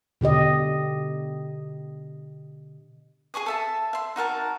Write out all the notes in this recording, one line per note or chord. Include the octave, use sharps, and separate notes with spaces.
B2 D3 G4 D#5
G#4 G#5 C#6 D#6
A4 E5 A5
E5 C6
D#4 F#4 A#4 A5